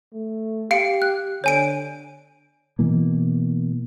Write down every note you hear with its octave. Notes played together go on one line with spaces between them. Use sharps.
A3
G4 F5 C#7 D7
F#6
D3 C#5 G#5 D7
B2 E3 A#3